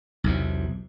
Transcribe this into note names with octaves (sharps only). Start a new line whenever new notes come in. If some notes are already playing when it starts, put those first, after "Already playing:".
B1 E2 C3